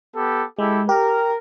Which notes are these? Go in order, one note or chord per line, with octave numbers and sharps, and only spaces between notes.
B3 G4 A4
G#3 E4 G4 A4
G4 A#4